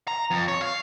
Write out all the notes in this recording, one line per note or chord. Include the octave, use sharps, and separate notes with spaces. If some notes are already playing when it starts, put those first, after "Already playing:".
A#5
F2
C#5
F5